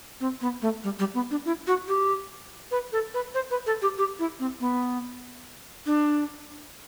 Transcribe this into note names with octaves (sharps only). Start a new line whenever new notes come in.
C4
B3
A3
G3
G3
B3
D4
E4
F#4
G4
B4
A4
B4
C5
B4
A4
G4
G4
E4
C4
B3
D4